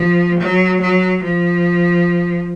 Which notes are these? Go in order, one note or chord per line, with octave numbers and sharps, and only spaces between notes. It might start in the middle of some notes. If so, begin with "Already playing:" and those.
Already playing: F3
F#3
F#3
F3